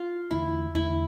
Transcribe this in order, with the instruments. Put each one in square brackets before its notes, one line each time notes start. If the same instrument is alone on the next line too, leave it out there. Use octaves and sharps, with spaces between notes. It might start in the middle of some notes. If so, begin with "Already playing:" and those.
Already playing: [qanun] F4
[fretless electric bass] E2 D3 A3 [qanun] E4
[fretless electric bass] E2 D3 A3 [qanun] E4